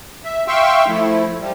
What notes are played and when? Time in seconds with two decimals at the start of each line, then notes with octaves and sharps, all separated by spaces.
0.24 E5
0.48 E5 F5 G5 C6 C#6 E6
0.88 F3 A3 E4
1.40 F3 G3